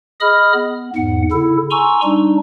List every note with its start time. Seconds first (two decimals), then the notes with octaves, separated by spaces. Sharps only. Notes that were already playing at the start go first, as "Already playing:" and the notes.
0.21 G#4 D#5 B5 D#6 F6
0.54 B3
0.96 E2 G#2 F#5
1.32 C#3 E4 A4
1.70 G#5 A#5 C6 C#6 E6
2.03 G3 D4 D#4